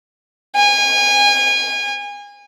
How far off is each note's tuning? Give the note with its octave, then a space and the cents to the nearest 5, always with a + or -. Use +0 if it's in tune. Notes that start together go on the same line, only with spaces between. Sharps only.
G#5 -30